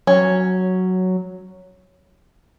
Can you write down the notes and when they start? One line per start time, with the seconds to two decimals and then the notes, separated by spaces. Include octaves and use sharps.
0.07 F#3 C#4